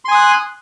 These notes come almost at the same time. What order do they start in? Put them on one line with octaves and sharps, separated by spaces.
C6 G#5 D#6 F#6